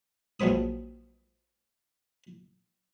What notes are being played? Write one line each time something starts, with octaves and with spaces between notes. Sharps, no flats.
A#1 F#3 C4 B4 D#6